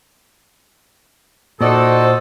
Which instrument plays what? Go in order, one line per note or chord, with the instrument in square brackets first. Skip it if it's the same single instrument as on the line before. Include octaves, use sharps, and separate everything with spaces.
[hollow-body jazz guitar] A#2 [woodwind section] D#4 F#4 A4 [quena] C5 [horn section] D5 D#5 F#5